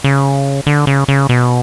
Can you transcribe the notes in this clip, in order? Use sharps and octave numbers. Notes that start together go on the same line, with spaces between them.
C#3
D3
C#3
C#3
B2